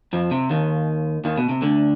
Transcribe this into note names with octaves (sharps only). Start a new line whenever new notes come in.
F2 F3
C3
D#2 D#3
D#2 D#3
B2
C3
D2 D3